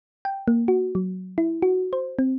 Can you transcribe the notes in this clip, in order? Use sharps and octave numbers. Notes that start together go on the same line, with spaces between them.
G5
A#3
F#4
F#3
E4
F#4
C5
C4